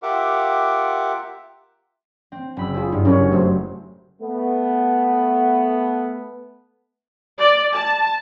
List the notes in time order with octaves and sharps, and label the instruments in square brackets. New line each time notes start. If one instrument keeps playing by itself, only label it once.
[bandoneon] F4 G4 A#4 E5 F#5 D6
[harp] C4
F#1 B5 E6
[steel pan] F4 G#4
[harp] G2 [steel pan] E4
[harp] F#1 [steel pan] C#4 A#4 C#5
[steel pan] F#3 A3 C5
[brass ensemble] A3 B3
[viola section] D5
A5